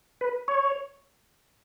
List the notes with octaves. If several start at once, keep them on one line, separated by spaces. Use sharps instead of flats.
B4
C#5